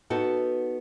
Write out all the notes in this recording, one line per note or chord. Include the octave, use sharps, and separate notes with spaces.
B3 D#4 F#4 A4